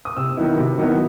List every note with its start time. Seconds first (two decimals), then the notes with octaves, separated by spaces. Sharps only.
0.05 D#6
0.17 C3 E6
0.37 D#3 F#3 B3 E4
0.57 C3
0.78 D#3 F#3 B3 E4